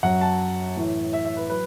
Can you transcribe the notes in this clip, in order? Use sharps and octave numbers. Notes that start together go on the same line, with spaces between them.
F#2 F#3 F#5
A5
A2 E3
E5
E5
B4
F#3 B4